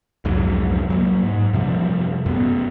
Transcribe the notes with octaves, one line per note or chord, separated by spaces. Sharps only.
C2 F2 G#2 F#3
F#3 G#3 A#3
G#2
F#2 C3 F3 G3
F#2 B3